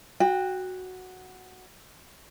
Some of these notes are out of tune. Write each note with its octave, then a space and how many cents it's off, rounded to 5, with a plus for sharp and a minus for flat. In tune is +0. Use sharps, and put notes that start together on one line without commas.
F#4 +0 G5 +25